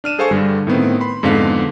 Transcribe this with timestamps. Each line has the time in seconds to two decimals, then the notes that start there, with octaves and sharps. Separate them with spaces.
0.04 D4 F6 D#7 E7
0.19 G#4 A4 C5 F5 G#5 C#6
0.31 G2 D3 G3
0.67 A2 D#3 B3 C4
1.01 B5 C6
1.23 F2 G#2 D3 B3 F5 B6